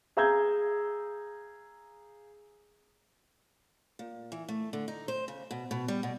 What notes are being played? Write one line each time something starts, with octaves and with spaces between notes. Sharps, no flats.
G#4 F5 A#5 E6 G6 G#6
A#2
E3
A3
D3
D#4
C5
C#3
B2
B2
G3
B2